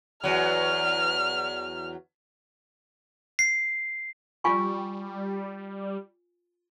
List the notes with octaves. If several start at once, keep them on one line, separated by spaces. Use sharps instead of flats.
E2 F#3 F6
C7
G3 F4 G#5 C#6